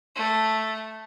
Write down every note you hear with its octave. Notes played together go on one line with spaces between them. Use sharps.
A3